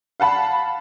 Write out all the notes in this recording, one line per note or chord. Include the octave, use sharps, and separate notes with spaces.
F5 F#5 A5 B5